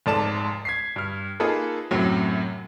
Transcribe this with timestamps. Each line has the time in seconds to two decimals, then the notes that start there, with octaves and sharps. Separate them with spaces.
0.06 F1 G#2 A4 D5 A5 E7
0.65 G#6 B6 C7
0.96 G2 F6
1.40 A#3 D#4 F4 G#4 A4 B4
1.91 F#2 A2 C3 F#3